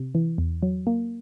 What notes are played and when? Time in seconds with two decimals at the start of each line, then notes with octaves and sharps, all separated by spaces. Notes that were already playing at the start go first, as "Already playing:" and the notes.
Already playing: C3
0.15 E3
0.38 E2
0.62 F#3
0.87 A#3